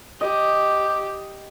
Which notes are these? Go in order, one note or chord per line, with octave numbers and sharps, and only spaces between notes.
G4 D#5